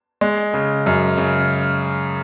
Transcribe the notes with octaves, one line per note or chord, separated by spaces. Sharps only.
G#3
C#3
F#2
C#3